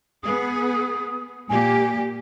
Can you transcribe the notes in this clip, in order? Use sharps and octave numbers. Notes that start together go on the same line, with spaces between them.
B3 G#4 D#6
A#2 A#3 G4 G#5